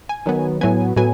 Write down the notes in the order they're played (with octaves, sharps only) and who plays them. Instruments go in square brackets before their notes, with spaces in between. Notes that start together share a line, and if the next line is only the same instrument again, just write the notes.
[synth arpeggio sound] G#5
D#3 F#3 B3
A2 F#3 B3 G#5
A2 F#3 B3 G#5